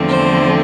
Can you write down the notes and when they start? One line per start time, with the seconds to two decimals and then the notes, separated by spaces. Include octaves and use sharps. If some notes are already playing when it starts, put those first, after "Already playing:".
Already playing: E2 D3 F3 A3 C4
0.08 C5